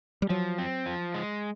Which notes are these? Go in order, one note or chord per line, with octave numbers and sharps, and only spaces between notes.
G3
F3 F#3
C4
F3
G#3